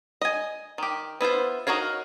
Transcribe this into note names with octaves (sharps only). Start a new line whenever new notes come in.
D#5 G#5
D#3 G4
B3 E4 F4 C5
D#4 F#4 A#4 C#5 F5